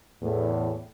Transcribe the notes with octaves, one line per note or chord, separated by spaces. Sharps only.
E2 A2